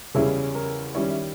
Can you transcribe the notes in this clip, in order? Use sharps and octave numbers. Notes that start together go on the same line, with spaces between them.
E2 C#3 G3 C#4 E4 G#4
A#4
D#3 G3 C#4 E4 C#5
E5